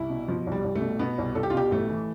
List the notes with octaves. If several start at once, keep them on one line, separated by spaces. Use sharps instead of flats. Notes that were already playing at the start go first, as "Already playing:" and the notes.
Already playing: C2 E4
B2
B2 F3
C2
G3
C2
A3
B2
B2 B3
C2
C2 A4
G4
F4
B2 G4
A1 A3
E3